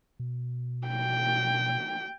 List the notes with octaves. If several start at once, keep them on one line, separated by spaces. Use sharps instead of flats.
B2
G5